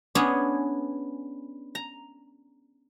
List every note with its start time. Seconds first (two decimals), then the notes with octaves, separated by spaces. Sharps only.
0.15 B3 C#4 D4 G#4
1.75 A#5